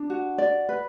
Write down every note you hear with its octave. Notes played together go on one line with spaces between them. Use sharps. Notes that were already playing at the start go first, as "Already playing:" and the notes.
Already playing: D4
F#4
D5
B4